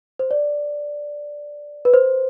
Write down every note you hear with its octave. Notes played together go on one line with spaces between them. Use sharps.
C5
D5
B4
C5